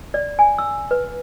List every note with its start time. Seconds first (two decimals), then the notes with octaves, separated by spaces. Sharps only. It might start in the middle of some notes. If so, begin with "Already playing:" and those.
0.14 D5
0.39 G#5
0.58 E6
0.91 B4